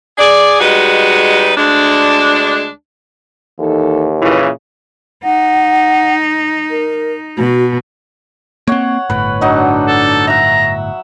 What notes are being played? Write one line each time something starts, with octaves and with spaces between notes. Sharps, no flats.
G#4 D5
G3 G#3 D#4 F#4 B4
D2 G#3 D4
D#2 E3 D#4 A4
A#2 C#3 E3 E4
D#4 F#5
A#4
B2 F#4
A#3 C4 C#5 F#5
G1 A2 B4
F#3 D4 D#4 F#5
A4
E5 F#5 A#5